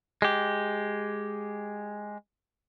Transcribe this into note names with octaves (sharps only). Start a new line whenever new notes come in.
G#3 G4